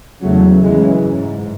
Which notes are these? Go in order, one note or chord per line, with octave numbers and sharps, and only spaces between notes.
E2 C#3 F#3 A3
F#2 C#3 E3 G#3
G#2